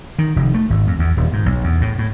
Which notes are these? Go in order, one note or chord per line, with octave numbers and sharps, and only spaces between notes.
D#3
F1
A3
G#1
F2
E2
D#1
G#2
B1
E2
A2
A2